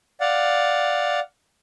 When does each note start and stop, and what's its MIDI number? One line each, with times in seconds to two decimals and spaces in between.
0.21 1.20 74
0.21 1.20 77
0.21 1.20 78